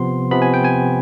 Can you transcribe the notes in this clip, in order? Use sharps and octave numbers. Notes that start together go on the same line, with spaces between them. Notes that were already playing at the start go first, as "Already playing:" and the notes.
Already playing: C3 F3 B3 C6
C3 F3 B3 B5
G#5
G5
G#5